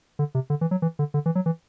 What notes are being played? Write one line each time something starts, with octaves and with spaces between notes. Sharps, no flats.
D3
C3
D3
E3
F#3
E3
D3
D3
E3
F#3
E3